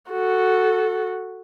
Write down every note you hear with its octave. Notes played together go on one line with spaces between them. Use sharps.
F#4 A4